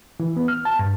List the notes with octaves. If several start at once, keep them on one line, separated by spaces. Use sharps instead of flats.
E3
B3
F6
A5
G2